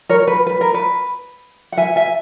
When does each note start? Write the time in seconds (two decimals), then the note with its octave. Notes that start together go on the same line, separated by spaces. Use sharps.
0.09 A#4 C#5
0.28 B4
0.47 B4
0.61 A#4
0.74 B4
1.72 F#5
1.77 E5 G#5
1.96 E5 G#5